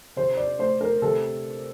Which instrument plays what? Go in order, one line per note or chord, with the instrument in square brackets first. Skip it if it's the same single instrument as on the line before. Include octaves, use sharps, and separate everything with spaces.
[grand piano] C3 C5
D5
A3 C5
A#4
C3 A4